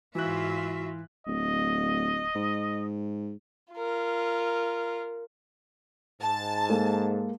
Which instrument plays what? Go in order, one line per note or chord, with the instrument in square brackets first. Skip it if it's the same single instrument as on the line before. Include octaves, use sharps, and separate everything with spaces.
[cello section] G#2 F4 E5 [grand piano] E3 F#6 [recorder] F#4
[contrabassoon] D1 [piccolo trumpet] D#5
[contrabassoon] G#2
[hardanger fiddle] F4 A#4
[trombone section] G#2 [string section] A5
[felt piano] G#3 A#3 A4